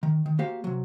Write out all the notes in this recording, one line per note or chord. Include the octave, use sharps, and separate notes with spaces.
D#3
D#3
A#3 F#4 G4 C5 F5
C3 F#3